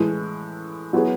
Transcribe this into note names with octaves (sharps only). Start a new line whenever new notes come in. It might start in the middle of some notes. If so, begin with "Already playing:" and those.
Already playing: A2 E3 G#3
F#3 B3 E4 G#4